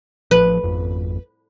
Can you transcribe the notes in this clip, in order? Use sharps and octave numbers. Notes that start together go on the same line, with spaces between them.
A1 F3 B4
G#1 F2